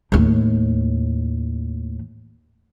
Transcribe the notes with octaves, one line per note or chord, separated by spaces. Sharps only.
D#2 A2